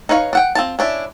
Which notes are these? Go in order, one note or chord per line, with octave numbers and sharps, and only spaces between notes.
D#4 B4 C#5 F5
D4 F#5 G5
C4 F4 A5
C#4 D4 E4